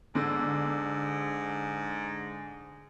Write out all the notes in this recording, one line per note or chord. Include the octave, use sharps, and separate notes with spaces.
G#2 D3